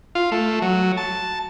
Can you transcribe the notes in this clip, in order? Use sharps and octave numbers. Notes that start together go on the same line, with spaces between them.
F4
A3
F#3
A5